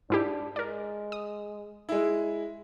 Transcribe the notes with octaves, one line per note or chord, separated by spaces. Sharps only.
G#2 D4 E4 G4
G#3 A#4 D5
D#6
G#3 E4